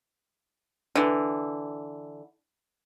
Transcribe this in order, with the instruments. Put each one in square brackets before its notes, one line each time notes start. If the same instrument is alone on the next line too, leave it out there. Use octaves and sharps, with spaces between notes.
[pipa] D3 E3